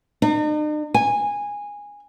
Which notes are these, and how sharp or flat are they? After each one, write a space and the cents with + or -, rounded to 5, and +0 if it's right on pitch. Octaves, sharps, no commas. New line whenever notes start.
D#4 -45
G#5 -15